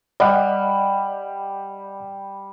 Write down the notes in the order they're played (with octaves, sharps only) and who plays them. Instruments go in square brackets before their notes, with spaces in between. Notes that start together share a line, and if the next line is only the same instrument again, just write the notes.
[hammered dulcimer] G3 [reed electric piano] D5 D#5 F#5